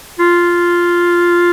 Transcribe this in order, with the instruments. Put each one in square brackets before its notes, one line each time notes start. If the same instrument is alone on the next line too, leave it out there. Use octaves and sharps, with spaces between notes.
[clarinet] F4